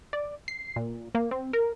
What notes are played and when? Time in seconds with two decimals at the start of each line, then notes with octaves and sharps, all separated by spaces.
0.13 D5
0.48 C7
0.76 A#2
1.15 A#3
1.31 C4
1.53 A#4